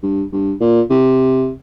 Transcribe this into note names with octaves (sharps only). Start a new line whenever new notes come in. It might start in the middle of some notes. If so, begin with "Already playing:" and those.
G2
G2
A#2
C3